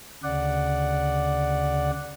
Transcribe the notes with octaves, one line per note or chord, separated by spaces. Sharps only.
D2 C#3 D5 F#5